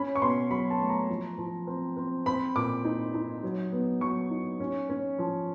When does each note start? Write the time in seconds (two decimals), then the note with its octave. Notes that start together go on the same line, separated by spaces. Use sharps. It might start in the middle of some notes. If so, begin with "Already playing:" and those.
Already playing: C#4 B5
0.16 C#6
0.22 B2 C6
0.50 F#3 B5
0.70 A5
0.80 A3
0.90 A#5
1.09 F3
1.38 F3
1.67 C4
1.97 C4
2.26 C4 B5
2.55 A#2 D6
2.85 D#4
3.14 D#4
3.43 F#3
3.72 B3
4.01 F#3 C#6
4.30 D#4
4.60 C#4
4.89 C#4
5.19 F3